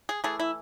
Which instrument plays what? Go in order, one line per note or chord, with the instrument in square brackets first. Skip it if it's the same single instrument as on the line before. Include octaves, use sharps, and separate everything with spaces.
[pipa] G#4
E3 A3 G#4
E4